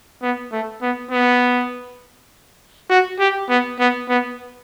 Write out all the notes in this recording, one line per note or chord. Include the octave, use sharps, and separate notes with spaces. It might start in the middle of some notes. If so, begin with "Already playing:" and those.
B3
A3
B3
B3
F#4
G4
B3
B3
B3